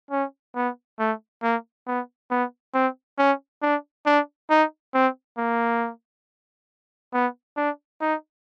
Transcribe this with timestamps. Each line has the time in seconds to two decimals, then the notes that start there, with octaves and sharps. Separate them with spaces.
0.11 C#4
0.56 B3
0.99 A3
1.43 A#3
1.87 B3
2.31 B3
2.74 C4
3.18 C#4
3.62 D4
4.06 D4
4.50 D#4
4.94 C4
5.38 A#3
7.13 B3
7.57 D4
8.01 D#4